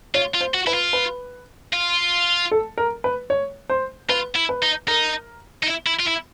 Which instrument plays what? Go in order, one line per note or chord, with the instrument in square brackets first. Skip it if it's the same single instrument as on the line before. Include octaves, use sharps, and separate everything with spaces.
[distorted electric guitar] F4 [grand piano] C#5
[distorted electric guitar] F4
[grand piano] C5
[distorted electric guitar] F#4
[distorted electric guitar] E4 [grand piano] B4
[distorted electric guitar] F4
[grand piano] B4
[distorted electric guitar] F4
[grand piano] A4
A#4
B4
C#5
C5
[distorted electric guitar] F4 [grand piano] B4
[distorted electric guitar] E4
[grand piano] B4
[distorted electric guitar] D#4
[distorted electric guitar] D#4 [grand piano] A#4
[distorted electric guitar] D#4
E4
E4
F4
E4